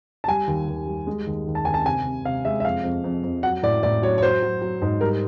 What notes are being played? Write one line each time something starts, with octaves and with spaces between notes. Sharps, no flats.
A5
G3 G#5
D#2
D#2
G3
G#3
D#2
D#2
A5
D#2 G#5
A5
C3 G#5
C3
C3 F5
G#3 E5
E5
F2 F5
F2
F2
F2
F#3 F#5
A2 D5
A2 D5
F#3 C#5
C#5
F#3 C5
F#3
F#3
G#2
G3 A#4